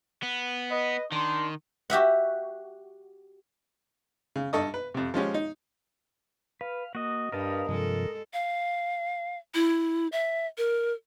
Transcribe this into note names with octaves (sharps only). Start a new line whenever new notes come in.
B3
B4 D#5
D#3 D4 C6
F#4 G4 E5 F#5
C#3
G2 A4 D#5 C#6 D#6
B4
F2 C3
F3 G#3 C#4 G4
D#4
B4 F5
A#3 F#4 D#5
G2 A#4 B4 D#5 F5 A5
G2 C3 F3 G#3 A4
F5
E4
E5
A#4